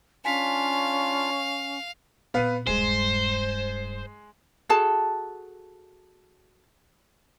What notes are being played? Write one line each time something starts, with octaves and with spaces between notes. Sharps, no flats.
C#4 D4 F4 F5 G#5 B6
A#2 B3 C4 B4 F5
D#1 G2 G#3 C5
F#4 G#4 A4 A5